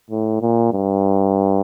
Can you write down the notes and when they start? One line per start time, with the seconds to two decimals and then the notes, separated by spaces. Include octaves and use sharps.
0.11 A2
0.41 A#2
0.72 G2